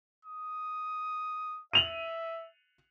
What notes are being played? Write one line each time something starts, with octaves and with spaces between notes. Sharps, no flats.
D#6
E5 D#7 F7 F#7